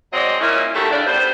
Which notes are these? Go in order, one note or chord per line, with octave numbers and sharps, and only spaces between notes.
F#3 G#3 C4 D5 D#5
A#2 C#4 E4
D#3 A3 E4 F#4 G4 A4
C#3 D4
G3 B3 C5